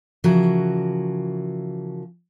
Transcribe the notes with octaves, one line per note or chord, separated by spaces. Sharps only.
C#3 E3 F3 F#4 A#4